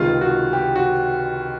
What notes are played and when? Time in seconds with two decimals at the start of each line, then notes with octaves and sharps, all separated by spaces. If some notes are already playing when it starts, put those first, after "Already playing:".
Already playing: C#2 C3 D#3 G#3 F4
0.21 F#4
0.53 G4
0.76 F#4